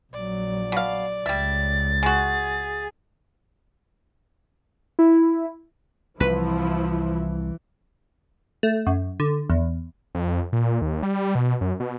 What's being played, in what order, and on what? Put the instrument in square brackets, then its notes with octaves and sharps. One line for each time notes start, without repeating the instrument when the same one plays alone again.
[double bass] A#1 F#3 [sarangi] D5
[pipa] B2 F5
[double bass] C#2 [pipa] G3 E5 [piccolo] A6
[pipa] G#3 F#4 [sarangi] G#4
[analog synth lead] E4
[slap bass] C2 [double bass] E3 [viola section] F3 E4 [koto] B4
[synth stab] A3
F#2
D3
E2
[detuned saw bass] F2
A#2
D#2
G3
B2
F#2
B2